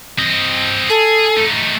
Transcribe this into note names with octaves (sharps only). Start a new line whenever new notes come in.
C4 D#5
G#4 A4
A3 D#4